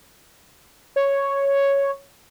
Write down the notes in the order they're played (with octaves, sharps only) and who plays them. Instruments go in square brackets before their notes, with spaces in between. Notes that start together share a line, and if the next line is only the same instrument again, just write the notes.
[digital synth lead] C#5